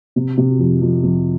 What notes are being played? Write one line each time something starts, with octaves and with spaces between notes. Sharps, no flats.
C3
C3
F2
F2
F2